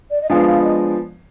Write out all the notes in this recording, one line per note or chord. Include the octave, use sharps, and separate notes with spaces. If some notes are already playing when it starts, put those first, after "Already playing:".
D5
D#5
F3 G#3 B3 D4 F5
F5
D#5